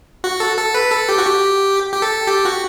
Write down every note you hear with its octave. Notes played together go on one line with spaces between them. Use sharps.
F#4
A4
A4
B4
A4
G4
F#4
G4
G4
A4
G4
F#4